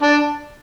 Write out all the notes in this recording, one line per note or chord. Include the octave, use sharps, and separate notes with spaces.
D4